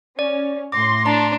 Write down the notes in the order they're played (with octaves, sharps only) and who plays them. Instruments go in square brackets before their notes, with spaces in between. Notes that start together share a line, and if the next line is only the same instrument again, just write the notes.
[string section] C#4 [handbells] D5
[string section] A2 C6 [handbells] D6 [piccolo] A#6
[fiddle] D4 [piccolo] A5 [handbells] A#5